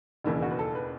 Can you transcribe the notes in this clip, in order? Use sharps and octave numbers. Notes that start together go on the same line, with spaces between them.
E1 D#2 C#3 E3 E4
F#4
B4
A4
B4